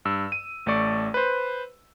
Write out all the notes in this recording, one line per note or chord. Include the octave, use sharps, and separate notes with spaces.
G2 E6
D#7
A1 A3 A4 D5 C#6
B4 C5